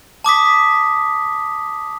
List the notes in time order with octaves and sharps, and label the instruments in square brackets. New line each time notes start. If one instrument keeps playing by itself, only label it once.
[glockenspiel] A5 D6 D#6 B6